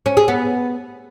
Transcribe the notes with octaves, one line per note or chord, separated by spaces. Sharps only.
C#4
G#4
B3